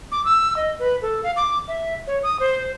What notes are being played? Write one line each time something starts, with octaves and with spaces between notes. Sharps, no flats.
D6
E6
D#5
B4
A4
F5
D6
E5
C#5
D#6
C5